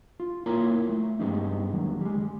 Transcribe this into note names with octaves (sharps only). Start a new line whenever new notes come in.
F4
A#3 E4 F4 A#4 C#5 A#5
A3
G2 G3 G#3 B3 C#4 D#4
D#2 D3 F#3
G3 G#3